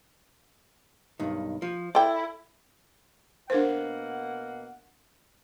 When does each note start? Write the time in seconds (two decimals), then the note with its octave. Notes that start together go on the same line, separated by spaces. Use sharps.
1.20 B1 G2 D#3
1.62 F3
1.95 E4 A4 D5 G5
3.50 B2 A#3 D4 A#4 C5 F#5